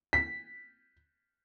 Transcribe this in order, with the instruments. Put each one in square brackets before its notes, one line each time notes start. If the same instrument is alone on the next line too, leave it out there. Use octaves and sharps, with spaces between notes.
[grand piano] B6